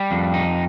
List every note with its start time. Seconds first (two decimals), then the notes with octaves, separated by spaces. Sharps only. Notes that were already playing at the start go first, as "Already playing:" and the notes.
Already playing: G3
0.11 F2
0.34 D#4